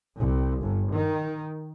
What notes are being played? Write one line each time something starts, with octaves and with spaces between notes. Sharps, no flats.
C2
G1
D#3